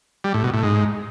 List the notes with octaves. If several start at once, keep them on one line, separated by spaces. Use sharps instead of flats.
G3
A2
B2
A2
G#2